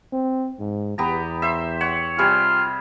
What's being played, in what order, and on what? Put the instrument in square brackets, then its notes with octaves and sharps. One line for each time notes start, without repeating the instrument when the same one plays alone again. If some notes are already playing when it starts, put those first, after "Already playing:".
[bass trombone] C4
G#2
[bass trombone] E2 [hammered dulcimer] B3 G4 A#5
[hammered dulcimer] C5 E5
C#5 F#5
[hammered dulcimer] C3 G3 G#4 [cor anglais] F4